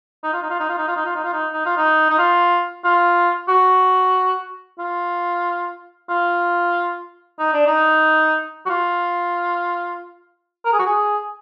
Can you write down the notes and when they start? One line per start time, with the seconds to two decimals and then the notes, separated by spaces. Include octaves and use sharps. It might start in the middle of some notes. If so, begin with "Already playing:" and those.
0.24 D#4
0.33 F4
0.43 D#4
0.51 F4
0.60 D#4
0.69 F4
0.78 D#4
0.88 F4
0.97 D#4
1.06 F4
1.15 D#4
1.24 F4
1.33 D#4
1.53 D#4
1.66 F4
1.78 D#4
2.10 D#4
2.19 F4
2.85 F4
3.49 F#4
4.79 F4
6.10 F4
7.39 D#4
7.53 D4
7.67 D#4
8.66 F#4
8.70 F4
10.65 A#4
10.73 G#4
10.79 F#4
10.86 G#4